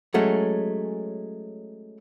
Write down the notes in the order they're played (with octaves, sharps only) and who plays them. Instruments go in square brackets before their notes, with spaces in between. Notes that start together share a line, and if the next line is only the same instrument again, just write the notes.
[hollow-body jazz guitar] F#3 G#3 A3 C#4